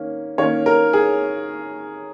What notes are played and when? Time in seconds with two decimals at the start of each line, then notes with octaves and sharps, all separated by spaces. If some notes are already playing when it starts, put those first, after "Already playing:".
Already playing: D#3 A#3 C#4
0.38 D#3 A#3 C#4 C#5
0.66 A#4
0.93 G#4